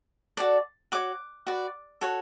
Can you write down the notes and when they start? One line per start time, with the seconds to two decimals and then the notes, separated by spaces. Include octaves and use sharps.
0.37 F#4 A4 D5
0.92 F#4 C#5 D6
1.47 F#4 B4 D5
2.01 F#4 A4 C#5